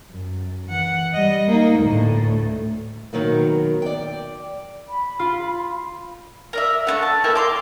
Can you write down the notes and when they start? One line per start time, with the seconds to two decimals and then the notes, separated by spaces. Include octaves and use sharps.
0.11 F#2
0.66 E3 F#5
1.13 G3 D#5
1.48 A#3 D#4
1.79 D2 A2
3.13 B2 D#3 F#3 A#3
3.82 D5 G5
4.89 B5
5.19 F4
6.53 A#4 D5 E5
6.87 A3 C4 F#5
7.03 A5
7.24 A#3 E4 A4 G5
7.35 A#5 C6 D6